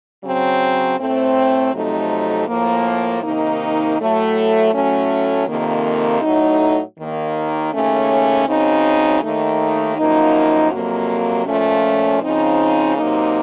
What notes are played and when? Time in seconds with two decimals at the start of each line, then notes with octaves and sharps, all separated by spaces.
0.23 C#3 F#3 C4
0.99 A2 A3 C4
1.73 F2 C3 F#3 A3 D#4
2.48 A2 F3 A#3
3.23 C3 D#3 A#3 D#4
3.98 A2 F#3 A3
4.73 A2 F#3 A3 C#4
5.47 F2 C3 D#3 A#3
6.22 A2 F#3 A3 D#4
6.97 D#2 D#3 A#3
7.73 D#2 C#3 A3 C#4
8.47 C#3 F#3 C4 D#4
9.22 D#2 D#3 A3 D#4
9.97 F#2 F3 A#3 D#4
10.72 F2 C3 F#3 A#3
11.46 A#2 F3 A3 C#4
12.22 C#3 F3 C4 D#4
12.97 C3 F#3 A#3 D#4